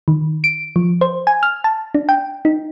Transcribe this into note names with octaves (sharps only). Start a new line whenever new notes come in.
D#3
D7
F3
C5
G#5
F6
A5
D4
G5
D#4